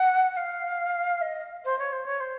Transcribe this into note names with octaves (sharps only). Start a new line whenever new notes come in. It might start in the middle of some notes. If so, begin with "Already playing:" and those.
Already playing: F#5
F5
D#5
C5
C#5
C5
C#5
C5